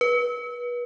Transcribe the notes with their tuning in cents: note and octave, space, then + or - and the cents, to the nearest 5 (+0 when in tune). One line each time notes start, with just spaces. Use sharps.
B4 -30